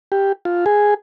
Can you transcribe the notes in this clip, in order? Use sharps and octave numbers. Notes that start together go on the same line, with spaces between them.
G4
F4
G#4